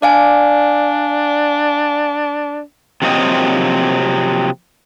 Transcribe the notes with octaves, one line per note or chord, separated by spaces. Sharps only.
D4 D5 F5 G#5
C3 F3 F#3 A#3 C4 D#5